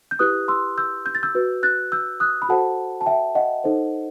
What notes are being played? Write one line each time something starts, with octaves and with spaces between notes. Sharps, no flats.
G6
E4 G4 B4 D#6 F#6
C6 E6
E6 G6
G6
A6
E6 G6
F#4 B4
F#6 A6
E6 G6
D#6 F#6
B5
F#4 A4 C5 F#5 A5
A5
E5 G5
D#5 F#5
D#4 A4 C5